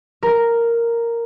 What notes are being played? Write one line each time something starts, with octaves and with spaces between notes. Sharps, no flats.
A#4